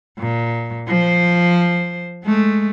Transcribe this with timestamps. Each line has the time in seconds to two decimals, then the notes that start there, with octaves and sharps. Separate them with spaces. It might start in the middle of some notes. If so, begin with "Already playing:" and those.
0.19 A#2
0.87 F3 C5
2.24 G#3 A3